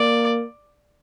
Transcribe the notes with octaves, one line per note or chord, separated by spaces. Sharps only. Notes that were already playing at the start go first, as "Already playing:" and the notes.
Already playing: A#3 D5